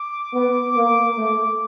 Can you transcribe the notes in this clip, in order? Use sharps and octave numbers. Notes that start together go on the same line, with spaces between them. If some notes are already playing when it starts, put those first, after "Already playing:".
Already playing: D6
B3
A#3
A3